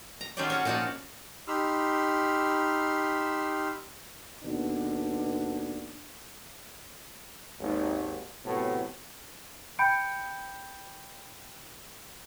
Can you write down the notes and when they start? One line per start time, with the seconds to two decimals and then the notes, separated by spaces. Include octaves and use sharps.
0.21 A#5
0.37 D#3 F#3 C#4 F4 G4 D5
0.50 C#4 F#4 F#5
0.65 A#2 F3 D#4 F#4 D5
1.48 D#4 G4 B5 C6 E6 F6
4.43 D#2 B2 D3 B3 D4
7.60 G#1 D#2
8.45 A2 C3 F#3 A3 B3
9.79 G5 B5 G6 C#7 D7